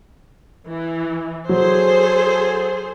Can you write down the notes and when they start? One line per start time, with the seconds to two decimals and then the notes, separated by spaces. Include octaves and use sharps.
0.69 E3
1.49 F#3 G#4 A4 C5